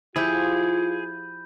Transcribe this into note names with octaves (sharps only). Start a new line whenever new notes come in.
F3 E4 F4 G4 G#4 B5 G6